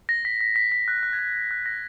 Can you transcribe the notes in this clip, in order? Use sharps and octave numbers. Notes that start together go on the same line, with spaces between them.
A#6
B6
B6
B6
B6
F#6
F#6
G#6
F#6
F#6
A#6